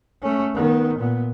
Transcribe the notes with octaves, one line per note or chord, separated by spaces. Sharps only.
A3 C#4
D#3 B3
A#2 B3